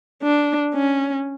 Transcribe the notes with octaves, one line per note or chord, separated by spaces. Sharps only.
D4
C#4